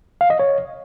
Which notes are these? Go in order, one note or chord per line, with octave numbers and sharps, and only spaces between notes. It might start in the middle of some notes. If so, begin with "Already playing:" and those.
F5
D#5
C#5